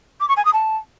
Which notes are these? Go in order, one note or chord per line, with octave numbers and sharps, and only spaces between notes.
D6
C#6
G#5
D#6
A5